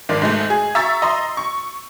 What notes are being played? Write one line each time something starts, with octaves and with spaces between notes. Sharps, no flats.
G1 G#2 D#3 D5
G#2 G#3 A3
G#4
E5 A#5 C#6 E6 A6
D#5 A#5 C6
C#6